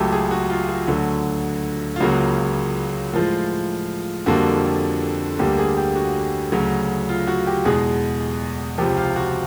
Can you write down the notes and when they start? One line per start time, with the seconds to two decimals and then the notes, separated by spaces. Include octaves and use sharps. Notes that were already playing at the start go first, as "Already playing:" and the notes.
Already playing: C#2 C#3 F#3 A3 G4 A4
0.12 G#4
0.31 F#4
0.50 F4
0.69 F#4
0.87 D2 D3 F#3
1.96 F4
2.00 C#2 C#3 F#3 A#3 F#4
3.13 A2 F3 G#3 F4
4.26 F2 D3 G3 A#3 F#4
5.39 D2 D3 G3 A#3 G4
5.58 G#4
5.77 G4
5.95 F#4
6.52 D2 C#3 F#3
7.09 F4
7.27 F#4
7.47 G4
7.65 E2 B2 G#3 G#4
8.78 C#2 C3 F3 G4
8.97 F4
9.16 F#4